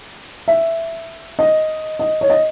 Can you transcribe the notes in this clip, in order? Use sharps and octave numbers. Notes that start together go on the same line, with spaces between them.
E5
D#5
D#5
C#5
D#5